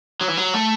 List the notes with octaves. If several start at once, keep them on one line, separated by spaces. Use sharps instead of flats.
F#3
E3
F#3
A3